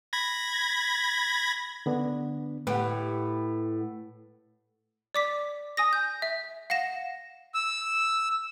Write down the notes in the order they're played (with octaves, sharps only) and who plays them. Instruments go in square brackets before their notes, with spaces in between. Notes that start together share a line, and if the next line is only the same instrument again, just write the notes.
[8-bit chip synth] B5 G#6 A#6
[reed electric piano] D3 B3 D4
[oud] A2 G4 [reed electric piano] B4 F#5
[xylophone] D5 D6 B6
G#5 D#6 A#6
G6
E5
F5 F#5 A#6 E7
[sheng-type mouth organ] E6